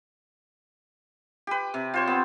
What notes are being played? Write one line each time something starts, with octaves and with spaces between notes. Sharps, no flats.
G4 B4
C3
F4 C5 C#5
B3 C4